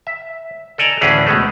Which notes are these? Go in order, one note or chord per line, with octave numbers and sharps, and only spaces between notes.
E5
A4 D5 D#5 G#5 A#5
D2 A2 E3 C#4 G#4 B4
B2 G#3 A3